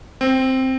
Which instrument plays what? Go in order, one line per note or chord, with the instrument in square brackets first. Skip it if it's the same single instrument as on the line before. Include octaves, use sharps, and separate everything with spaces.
[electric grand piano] C4